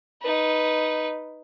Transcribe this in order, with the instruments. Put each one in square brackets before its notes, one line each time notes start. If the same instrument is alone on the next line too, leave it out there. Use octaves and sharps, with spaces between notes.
[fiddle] D#4 B4